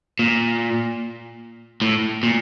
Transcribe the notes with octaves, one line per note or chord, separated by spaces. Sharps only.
A#2
A2
A#2